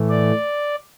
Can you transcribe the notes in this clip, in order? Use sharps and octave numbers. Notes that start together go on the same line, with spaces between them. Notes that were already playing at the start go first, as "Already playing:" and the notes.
Already playing: A2 E3 A3
D5